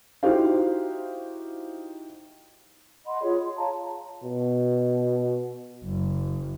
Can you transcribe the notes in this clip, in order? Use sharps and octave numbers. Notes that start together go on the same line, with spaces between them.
D#4 E4 F#4 G4 C5 F5
D#5 F#5 B5 C6
F4 G#4 C#5
C6
C#5 F5 A5 A#5
B2
F#1